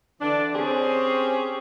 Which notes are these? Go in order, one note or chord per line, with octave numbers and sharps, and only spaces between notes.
D3 E3 D4
C4 C#4 G4 G#4 C5